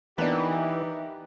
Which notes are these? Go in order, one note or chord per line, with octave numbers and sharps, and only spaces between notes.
E3 A#3 B3 D4 D#4 G4